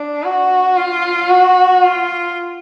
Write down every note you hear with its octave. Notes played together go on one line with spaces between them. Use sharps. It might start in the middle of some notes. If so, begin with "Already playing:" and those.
Already playing: D4
F#4
F4
F#4
F4